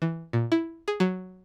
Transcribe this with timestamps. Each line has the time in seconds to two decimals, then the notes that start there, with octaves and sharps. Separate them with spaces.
0.02 E3
0.33 A#2
0.52 E4
0.88 G#4
1.00 F#3